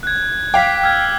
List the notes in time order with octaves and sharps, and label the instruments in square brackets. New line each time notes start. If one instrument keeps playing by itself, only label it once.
[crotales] F#6 G#6
[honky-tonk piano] F5 G5 [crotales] D6 B6
[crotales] E6 F6 G#6